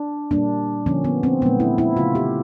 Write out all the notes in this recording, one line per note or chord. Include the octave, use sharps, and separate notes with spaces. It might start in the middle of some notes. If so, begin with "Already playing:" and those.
Already playing: D4
A#2 G3 A#3 D4
D3 F3 A#3 C#4
B3
C4
A#2 F#3 A3 B3
E4
E4
C#3 F3 A3 F4
G4